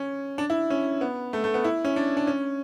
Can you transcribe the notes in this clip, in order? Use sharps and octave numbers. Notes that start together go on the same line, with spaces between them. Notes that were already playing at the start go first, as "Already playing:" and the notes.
Already playing: C#4
D4
E4
C#4
B3
A3
A3
B3
E4
C#4
D4
D4
C#4